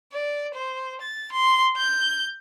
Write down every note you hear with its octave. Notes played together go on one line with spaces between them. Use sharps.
D5
C5
A6
C6
G6